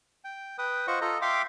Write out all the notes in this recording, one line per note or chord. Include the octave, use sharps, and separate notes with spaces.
G5
B4 G5 D#6
F4 C5 D#5 F#5 C#6
F4 A4 D#5 A#5
E5 F5 G5 C6 D6